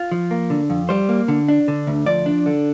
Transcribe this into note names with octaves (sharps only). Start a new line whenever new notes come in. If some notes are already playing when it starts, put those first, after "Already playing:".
Already playing: F4
F3
A#3
D3
F2
G3 C5
A#3
D3
D4
D3
D2
F3 D5
D4
D3